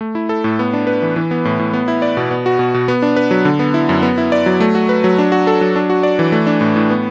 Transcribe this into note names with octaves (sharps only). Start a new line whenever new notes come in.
A3
E4
A4
A2
B3
D4
B4
E3
E3
B3
A2
A2
B3
E4
D5
B2
B3
F#4
B2
B2
B3
D4
B4
F#3
D3
B3
E4
F#2
B3
E4
D5
F#3
A3
F#4
B4
F#3
D4
F#4
A4
F#3
D4
F#4
D5
E3
A3
D4
A2
A2
B3